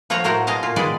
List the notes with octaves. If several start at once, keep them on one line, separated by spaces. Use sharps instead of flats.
F3 F4 C#5 F#5 A#5
A2 F#3 A#4 C5 F#5 G5
B2 G#3 D#5 F5 A5
A#2 F4
D#3 G#3 B3 G#4 D5 G#5